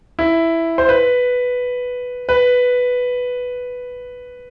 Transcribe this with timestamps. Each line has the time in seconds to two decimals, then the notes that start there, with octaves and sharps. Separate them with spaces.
0.19 E4
0.78 C5
0.89 B4
2.29 B4